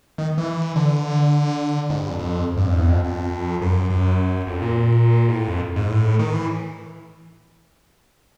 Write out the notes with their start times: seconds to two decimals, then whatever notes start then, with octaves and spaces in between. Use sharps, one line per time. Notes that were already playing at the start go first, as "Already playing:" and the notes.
0.18 D#3
0.38 E3
0.76 D3
1.90 G#2
2.00 G2
2.09 F2
2.19 F2
2.57 G2
2.66 F2
2.76 E2
2.90 F2
3.04 F2
3.61 F#2
3.90 F#2
4.47 F2
4.62 A#2
5.28 G#2
5.33 A2
5.48 F2
5.76 G#2
5.90 A2
6.19 D#3
6.33 E3